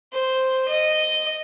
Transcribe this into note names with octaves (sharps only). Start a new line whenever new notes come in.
C5
D#5